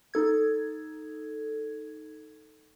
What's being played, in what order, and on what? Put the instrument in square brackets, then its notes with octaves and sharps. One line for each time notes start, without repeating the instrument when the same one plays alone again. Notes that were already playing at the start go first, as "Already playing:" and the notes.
[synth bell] D#4 A4 G#6